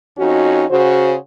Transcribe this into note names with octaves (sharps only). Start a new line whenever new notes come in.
F2 C#4 D#4 F#4
C#3 F#4 C5